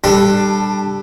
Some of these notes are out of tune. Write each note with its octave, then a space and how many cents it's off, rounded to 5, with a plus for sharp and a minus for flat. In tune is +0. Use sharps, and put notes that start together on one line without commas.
G3 +10 D4 +20 A4 +0